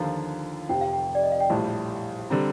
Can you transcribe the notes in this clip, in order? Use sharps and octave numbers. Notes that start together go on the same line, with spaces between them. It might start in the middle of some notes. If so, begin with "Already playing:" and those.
Already playing: D#2 D3 F3 A#5
F1 F2 C3 F3 G5
F5
G5
D5
D#5
F5
G5
A#1 A2 G3 A5
D3 G3 C4 A#5